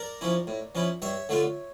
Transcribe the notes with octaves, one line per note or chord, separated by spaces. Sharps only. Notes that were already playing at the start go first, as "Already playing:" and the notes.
Already playing: A#4 D5
F3 C#4 E4
A2
F3 C#4 E4
G2 C#5 E5
D3 A3 D4 F4